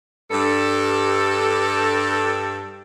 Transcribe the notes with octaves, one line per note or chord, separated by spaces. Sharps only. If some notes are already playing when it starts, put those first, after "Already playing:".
G2 A4